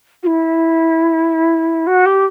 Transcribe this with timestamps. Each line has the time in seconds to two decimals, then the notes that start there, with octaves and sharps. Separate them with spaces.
0.23 F#4
0.27 E4
1.87 F#4
2.06 G4